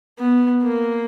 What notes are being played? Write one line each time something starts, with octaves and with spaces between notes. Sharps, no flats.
B3
A#3